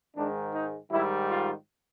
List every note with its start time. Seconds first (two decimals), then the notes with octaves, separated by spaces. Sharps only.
0.16 G#2 D#3 G#3 D4
0.53 D#4
0.91 G#2 D#3 G3 E4
1.28 F4